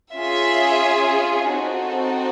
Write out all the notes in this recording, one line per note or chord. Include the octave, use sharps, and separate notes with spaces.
C#4 F4 G#4 E5
C4 D#4 F#4 A4